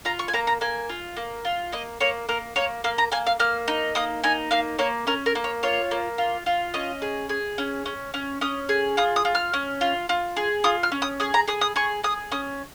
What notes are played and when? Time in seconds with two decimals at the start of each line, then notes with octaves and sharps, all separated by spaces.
0.05 F4 A#5
0.19 C#6
0.28 G#5
0.33 A#3 A#5
0.47 A#5
0.61 A#3 G#5
0.89 F4
1.17 A#3
1.45 F4
1.72 A#3 D#5
2.00 A#3 C#5
2.29 A#3 A#4
2.56 A#3 C#5
2.84 A#3 F5
2.98 A#5
3.12 A#3 G#5
3.26 F5
3.40 A#3 F6
3.68 D#4
3.95 A#3 D#6
4.24 D#4 G#5
4.51 A#3 F5
4.79 A#3 C#5
5.07 C#4 A#4
5.26 A#4
5.35 A#3
5.44 C#5
5.63 F4 C#5
5.91 A#3
6.18 F4
6.46 F4
6.74 C#4 D#5
7.02 G#4
7.29 G#4
7.58 C#4
7.86 C#4
8.14 C#4
8.41 C#4 D#6
8.69 G#4
8.97 F4 D#6
9.16 D#6
9.25 F4
9.35 F6
9.54 C#4
9.81 F4
10.09 F4
10.36 G#4
10.64 F4 D#6
10.83 F6
10.92 C#4
11.02 D#6
11.20 G#4 D#6
11.34 A#5
11.48 G#4 D#6
11.61 D#6
11.76 G#4 C#6
12.04 G#4 D#6
12.32 C#4 D#6